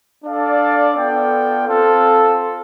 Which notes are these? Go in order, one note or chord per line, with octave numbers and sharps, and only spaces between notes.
D4 A4 D5 F5
B3 F4 A4 D5 G5
C4 F4 A4